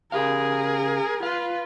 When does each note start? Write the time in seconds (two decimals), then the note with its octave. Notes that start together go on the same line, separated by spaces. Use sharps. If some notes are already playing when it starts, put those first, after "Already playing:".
0.12 C#3 G4 G#4 A#4 F5
1.23 F4 B4 F5